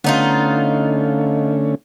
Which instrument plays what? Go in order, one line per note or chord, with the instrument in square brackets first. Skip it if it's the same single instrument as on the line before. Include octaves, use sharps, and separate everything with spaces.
[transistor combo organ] D3 A3 C#4 [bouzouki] B3 D#4 F4